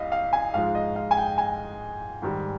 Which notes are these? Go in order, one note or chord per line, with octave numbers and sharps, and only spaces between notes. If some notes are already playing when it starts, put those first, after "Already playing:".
Already playing: C2 D#5 F5
F5
G#5
G#2 F3 G#3 F5
D#5
F5
G#5
G5
G#5
G#2 D#3 G3